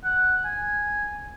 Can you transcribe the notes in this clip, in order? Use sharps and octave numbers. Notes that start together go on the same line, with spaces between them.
F#5
G#5